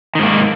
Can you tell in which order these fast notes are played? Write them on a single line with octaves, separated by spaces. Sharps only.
D#3 G#2 A#3